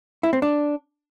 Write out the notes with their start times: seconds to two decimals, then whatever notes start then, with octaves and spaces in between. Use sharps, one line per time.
0.23 E4
0.33 C4
0.42 D4